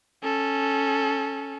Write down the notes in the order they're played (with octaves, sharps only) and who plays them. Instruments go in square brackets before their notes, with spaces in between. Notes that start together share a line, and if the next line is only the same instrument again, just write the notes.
[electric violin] C#4 A4